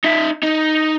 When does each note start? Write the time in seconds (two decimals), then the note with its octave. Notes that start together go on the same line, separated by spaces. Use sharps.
0.04 D#4 E5
0.43 D#4